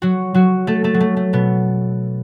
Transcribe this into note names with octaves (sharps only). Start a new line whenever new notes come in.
F#3 F#4
F#3 F#4
A3 A4
A3 A4
F#3
A3
A3
B2 B3